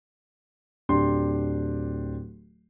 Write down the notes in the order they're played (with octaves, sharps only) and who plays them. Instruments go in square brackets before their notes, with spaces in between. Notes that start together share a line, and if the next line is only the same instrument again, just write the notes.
[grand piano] D1 D4 G4 C6